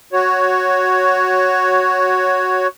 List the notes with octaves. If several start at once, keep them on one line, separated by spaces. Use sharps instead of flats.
F#4 C#5